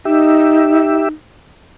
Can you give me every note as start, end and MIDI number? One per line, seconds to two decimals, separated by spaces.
0.05 1.08 63
0.05 1.09 67
0.05 1.09 76